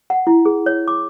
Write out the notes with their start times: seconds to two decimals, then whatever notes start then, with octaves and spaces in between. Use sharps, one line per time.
0.10 F#5
0.27 E4
0.45 G#4
0.66 C#5
0.88 D6